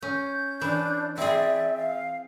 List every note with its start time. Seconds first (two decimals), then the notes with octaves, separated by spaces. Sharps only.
0.02 C#4 G6
0.61 E3 D4
1.18 C4 G#4 D5 E5
1.77 F5